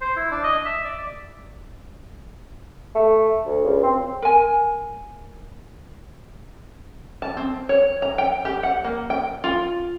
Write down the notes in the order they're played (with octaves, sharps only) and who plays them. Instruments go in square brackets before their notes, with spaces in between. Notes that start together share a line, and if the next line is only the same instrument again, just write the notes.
[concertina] C5
E4
D4
D#5
E5
D5
[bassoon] A3
D2
C#2
C4
[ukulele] A#4 G#5
[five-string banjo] A5
C4
C#5
A#5
G5
G4
F#5
A#3
G5
F4